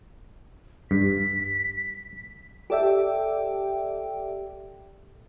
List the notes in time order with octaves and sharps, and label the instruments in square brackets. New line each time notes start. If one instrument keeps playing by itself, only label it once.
[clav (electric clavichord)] G2 [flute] B6
[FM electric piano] G4 A4 D5 E5 G5